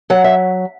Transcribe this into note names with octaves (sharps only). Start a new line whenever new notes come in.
F#3 F#5
E5